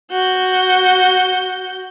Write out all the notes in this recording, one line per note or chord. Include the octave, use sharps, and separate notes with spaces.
F#4 G6